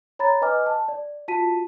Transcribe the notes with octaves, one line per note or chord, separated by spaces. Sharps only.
C#5 A#5 B5 A6
B4 D#5 G#5 D6 F6
A5
D5
F4 F#4 A5 B6 D#7